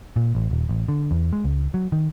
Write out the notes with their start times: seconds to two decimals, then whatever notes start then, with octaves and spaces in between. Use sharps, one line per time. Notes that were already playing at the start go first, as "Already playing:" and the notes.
0.16 A#2
0.35 A1
0.51 D#1
0.69 A1
0.88 D3
1.11 E2
1.33 G#3
1.44 C#2
1.74 F#3
1.92 D#3